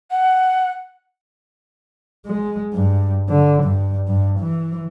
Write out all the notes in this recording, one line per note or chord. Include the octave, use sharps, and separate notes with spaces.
F#5
G#3
G2
D3
G2
G2
E3